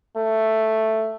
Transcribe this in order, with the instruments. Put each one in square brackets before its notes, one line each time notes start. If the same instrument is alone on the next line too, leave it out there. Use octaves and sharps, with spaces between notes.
[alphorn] A3